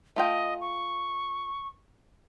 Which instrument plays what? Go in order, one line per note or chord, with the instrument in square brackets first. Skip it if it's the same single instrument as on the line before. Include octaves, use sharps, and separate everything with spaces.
[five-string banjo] A3 F4 G5 [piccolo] D#5
[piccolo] C#6